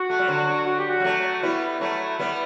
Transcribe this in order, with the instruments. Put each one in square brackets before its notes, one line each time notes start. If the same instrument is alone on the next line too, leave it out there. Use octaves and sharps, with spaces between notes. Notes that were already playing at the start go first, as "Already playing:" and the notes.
Already playing: [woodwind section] F#4
[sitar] A3
G3
D3 F#3
[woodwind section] F#4
G4
F#4
[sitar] G3
F#3 A3
[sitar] G3 B3 [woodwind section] E4
[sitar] F#3 A3
G3 B3